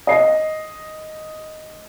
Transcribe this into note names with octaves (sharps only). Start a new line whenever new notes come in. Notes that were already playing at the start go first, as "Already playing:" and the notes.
D#5 C7